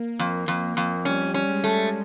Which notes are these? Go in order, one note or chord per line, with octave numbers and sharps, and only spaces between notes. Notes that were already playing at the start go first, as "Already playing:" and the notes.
Already playing: A#3
F2
F2
F2
G3 C#4
C#4
G#3
A3